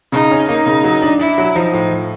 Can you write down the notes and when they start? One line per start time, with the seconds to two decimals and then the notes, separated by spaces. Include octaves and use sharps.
0.12 C#3 D#4
0.31 C#4
0.48 A#3 D#4
0.66 C#3
0.84 F#3
1.02 D4
1.19 D4 E4
1.38 F#3
1.55 F3 D#4
1.73 A2
1.91 F3